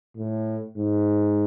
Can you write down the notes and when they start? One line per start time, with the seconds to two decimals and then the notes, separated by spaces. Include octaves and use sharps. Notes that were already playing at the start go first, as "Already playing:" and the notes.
0.17 A2
0.77 G#2